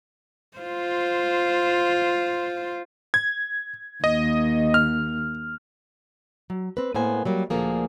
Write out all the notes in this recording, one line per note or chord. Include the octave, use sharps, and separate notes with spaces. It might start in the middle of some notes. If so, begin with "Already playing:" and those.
F4 C5
G#6
D#2 D#5
F6
F#3
C4 B4
A2 A#3 B3 C5 G#5
F#3 G3 A#3
D2 A#2 D3 F3 A#3 G#4